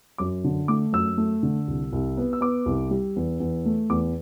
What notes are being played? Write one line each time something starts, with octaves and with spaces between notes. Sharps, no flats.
F#2 D6
D3
A3 D6
F#2 E6
A3
D3
C2
C2
B3
E6
B3 D6
C2
G3
E2
E2
A3
E2 D6